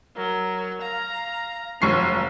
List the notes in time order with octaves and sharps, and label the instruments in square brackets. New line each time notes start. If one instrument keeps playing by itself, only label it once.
[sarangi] F#3 [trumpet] A#4
[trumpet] F5 [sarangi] A#5
[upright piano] F1 C#6 C7 [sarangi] F#3 [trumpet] F4